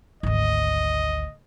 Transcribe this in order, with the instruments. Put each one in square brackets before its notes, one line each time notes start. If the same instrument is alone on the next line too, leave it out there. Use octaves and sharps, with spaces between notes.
[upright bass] G#1 D2 [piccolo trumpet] D#5